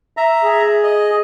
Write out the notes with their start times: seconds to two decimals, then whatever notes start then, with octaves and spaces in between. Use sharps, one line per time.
0.17 E5 A#5
0.44 G#4
0.83 D#5